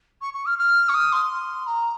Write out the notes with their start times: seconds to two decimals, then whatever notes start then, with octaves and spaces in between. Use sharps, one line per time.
0.21 C#6
0.34 C#6
0.46 F6
0.58 F6
0.89 C#6
0.94 D#6
1.12 C6
1.67 A#5